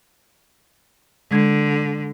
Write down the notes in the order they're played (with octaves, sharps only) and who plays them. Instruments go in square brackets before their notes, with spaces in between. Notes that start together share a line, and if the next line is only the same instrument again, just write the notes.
[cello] D3 [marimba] G#3 G#6